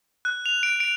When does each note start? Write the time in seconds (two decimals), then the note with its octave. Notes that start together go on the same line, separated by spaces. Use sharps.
0.25 F#6
0.46 F7
0.63 D7
0.80 D7